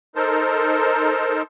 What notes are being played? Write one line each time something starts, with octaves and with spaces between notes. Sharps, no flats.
D#4 A4 A#4 C5